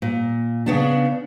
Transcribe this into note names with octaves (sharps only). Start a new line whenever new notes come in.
A#2
C#3 B3 D4